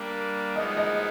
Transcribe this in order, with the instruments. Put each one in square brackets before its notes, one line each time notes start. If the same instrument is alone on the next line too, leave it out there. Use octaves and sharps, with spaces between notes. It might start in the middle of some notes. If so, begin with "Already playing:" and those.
Already playing: [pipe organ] G3 A#3 D4
[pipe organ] F3 G#3 B3 D#4 [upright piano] D#5
[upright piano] D#5